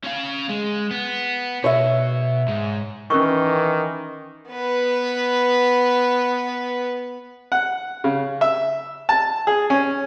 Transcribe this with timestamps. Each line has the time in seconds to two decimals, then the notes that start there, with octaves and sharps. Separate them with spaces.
0.03 C#4 F5
0.49 G#3
0.91 B3
1.64 B2 C#5 E5
2.48 G#2
3.10 D#3 E3 C#4 A#4 C#6
4.50 B3 B4
7.52 F#5
8.04 C#3
8.41 E5
9.09 A5
9.47 G#4
9.70 C#4